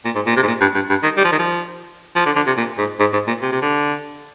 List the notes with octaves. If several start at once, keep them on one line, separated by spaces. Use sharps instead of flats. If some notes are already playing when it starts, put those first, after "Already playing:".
A#2
G#2
A#2
C3
G#2
A#2
G2
G2
G2
D#3
G3
F3
D#3
F3
F3
D3
D3
C3
A#2
G#2
G#2
G#2
A#2
C3
C3
D3